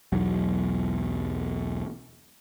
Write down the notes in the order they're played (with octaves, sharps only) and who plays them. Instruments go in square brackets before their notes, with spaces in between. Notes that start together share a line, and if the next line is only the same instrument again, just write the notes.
[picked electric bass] B1 E2 F#3